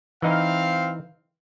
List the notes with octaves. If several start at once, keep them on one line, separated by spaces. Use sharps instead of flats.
E3 C4 D#4 E4 F5